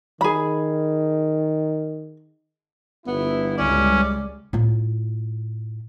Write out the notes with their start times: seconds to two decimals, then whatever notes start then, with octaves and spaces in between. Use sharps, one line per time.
0.21 D#3 G#4 B5
3.07 G1 B3 E4
3.58 C#2 G3 G#3 C#4 D5
4.53 A2 F4